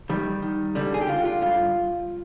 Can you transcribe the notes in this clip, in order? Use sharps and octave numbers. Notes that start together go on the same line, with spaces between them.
D#3 G3
D#3
D3 G3
G#4
G4
D3 F4
F4
G2 F4